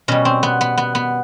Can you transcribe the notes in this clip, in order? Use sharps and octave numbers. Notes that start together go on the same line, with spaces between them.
B2 G3 C#4
C4
B3
B3
B3
B3